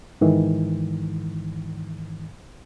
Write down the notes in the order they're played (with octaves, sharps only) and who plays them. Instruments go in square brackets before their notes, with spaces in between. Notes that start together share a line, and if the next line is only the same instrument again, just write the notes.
[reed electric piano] G#2 D#3 E3